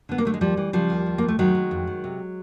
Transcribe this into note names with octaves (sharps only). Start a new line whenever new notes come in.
D3 B3
A#3
D3 A3
G#3
D#2 F3 G3
E3
C#3 F3 G3
D#2
D#2
D#2 A#3
A3
D#3 F#3 G#3
D#3
F2
D#3
C3